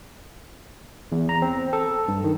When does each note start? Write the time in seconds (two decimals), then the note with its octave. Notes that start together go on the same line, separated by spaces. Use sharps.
1.12 E2
1.29 A#5
1.42 C4
1.73 A4
2.08 G2
2.24 D#3